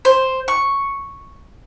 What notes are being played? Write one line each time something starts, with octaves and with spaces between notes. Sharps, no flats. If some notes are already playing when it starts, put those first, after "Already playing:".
C5
C#6